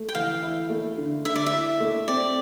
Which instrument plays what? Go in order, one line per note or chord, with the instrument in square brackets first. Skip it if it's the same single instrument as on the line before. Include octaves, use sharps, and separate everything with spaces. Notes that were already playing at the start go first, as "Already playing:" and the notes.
Already playing: [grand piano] A3
[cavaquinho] G5
[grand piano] E3 [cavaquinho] F5
[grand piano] E4
A3
D3
[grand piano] D3 [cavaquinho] E5
[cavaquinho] D5
E5
[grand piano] E4
A3
[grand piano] C4 [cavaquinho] D5